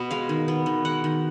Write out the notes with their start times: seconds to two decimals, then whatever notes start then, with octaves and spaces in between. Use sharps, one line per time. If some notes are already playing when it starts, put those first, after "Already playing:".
Already playing: B2 B3
0.11 G#3 F5
0.29 D#3
0.48 B3
0.66 D#3
0.85 G#3 F#5
1.04 D#3